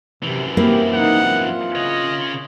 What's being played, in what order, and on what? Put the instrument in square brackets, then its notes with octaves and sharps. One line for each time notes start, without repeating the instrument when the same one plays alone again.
[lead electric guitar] F#2 E3 [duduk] C3
[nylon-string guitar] A#3 C4 E4 [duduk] G4
[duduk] D#4 [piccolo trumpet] F#5
[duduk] F4
[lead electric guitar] C#3 C#5 [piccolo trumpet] D#5